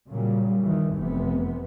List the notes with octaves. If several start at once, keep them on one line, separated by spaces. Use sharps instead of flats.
A#2 C#3 F#3 G3
D#2 D#3 E3
F1 C3 E3 B3